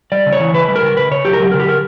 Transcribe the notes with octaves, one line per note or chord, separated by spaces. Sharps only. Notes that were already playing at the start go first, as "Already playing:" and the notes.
G3 D5
C#3
C#5
E3
C#3 B4
G3
A#4
C#3
C#3 B4
C#3 C#5
F#3 G4
A#4
F#3 G4
C#3 A#4
G4
C#3 A#4